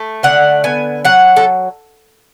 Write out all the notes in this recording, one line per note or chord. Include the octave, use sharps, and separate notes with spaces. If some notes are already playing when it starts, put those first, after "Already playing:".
Already playing: A3
D3 F#5
B3 G#5
F#3 F#5
A4